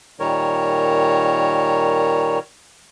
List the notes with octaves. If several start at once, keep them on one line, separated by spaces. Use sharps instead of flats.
A#2 D#3 G3 A#4 C#5